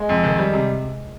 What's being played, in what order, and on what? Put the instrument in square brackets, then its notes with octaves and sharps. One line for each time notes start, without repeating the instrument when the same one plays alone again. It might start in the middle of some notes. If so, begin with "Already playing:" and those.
Already playing: [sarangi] G#3
[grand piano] F2
D#3
G3
C3